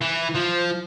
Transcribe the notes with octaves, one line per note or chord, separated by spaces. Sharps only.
E3
F3